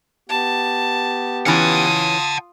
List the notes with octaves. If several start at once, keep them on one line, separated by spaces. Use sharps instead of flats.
B3 G4 A5
E3 C#4 F4 F#5 A5 D#6